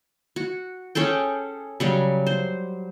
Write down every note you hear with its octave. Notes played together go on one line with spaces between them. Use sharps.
F#4
C#4 G#4 A4 G5
C#3 F#3 G3
C5